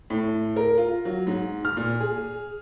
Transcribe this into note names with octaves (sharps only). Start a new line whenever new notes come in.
A2
A#4
F4
F#3
G#2
F6
A#2
G#4